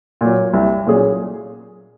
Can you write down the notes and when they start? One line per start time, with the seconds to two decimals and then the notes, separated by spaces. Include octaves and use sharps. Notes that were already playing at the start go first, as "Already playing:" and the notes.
0.21 A#2 F#3
0.54 C2
0.86 A#2 F#3 C#4 G#4